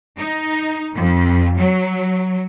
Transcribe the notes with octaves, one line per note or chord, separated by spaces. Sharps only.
D#4
F2
F#3